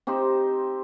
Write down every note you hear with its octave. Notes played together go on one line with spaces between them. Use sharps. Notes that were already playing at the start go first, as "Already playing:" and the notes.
C4 D#4 G4 C5